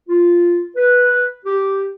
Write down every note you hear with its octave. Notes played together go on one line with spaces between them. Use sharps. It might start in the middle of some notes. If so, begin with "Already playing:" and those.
F4
B4
G4